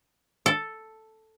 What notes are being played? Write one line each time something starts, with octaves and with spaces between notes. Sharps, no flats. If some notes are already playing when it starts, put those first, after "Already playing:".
A4